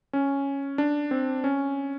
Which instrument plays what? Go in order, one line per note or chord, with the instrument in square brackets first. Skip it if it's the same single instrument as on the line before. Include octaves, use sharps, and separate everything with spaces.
[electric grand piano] C#4
D4
C4
C#4